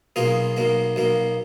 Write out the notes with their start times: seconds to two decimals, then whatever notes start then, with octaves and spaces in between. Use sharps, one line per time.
0.16 B1 B2 A#3 F4 G#4
0.57 B1 B2 A#3
0.96 B1 B2 A#3